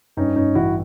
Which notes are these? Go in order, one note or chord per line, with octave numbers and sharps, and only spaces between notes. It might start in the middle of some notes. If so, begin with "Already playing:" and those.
G2 C#4 D#4
G2 C#4 D#4
A1 E4 F#4